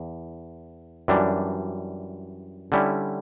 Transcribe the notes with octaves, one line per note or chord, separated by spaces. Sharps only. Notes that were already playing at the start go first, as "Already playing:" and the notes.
Already playing: E2
F#2 E3 G3 D4
D3 G3 C#4 E4